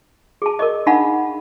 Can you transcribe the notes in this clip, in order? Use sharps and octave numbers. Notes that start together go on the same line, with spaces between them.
G#4 A5
A#4 D5 D#5
D4 D#4 F5 F#5 A5 B5